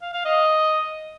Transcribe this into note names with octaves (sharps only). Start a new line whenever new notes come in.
F5
F5
D#5